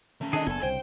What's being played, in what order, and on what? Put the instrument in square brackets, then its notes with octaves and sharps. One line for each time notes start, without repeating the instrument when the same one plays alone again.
[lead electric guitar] D#2 C#4 [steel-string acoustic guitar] A3 A#5
[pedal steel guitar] D3 D#3 G#4 [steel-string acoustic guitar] D4 D#5
[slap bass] F#1 B3 [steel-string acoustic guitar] E2 A2 [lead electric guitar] A4 A5 [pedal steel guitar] G#5
[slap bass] C2 C#3 [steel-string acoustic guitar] C5 [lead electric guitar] G5